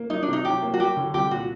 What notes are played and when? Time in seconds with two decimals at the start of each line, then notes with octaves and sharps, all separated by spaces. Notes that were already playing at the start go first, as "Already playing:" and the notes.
Already playing: A#3
0.10 F#3 D#4
0.23 D4
0.28 C3 D#4
0.45 F#3 G4
0.62 A#3
0.74 F#4
0.79 F#3 G4
0.97 D3
1.14 C2 G4
1.31 A#2 F#4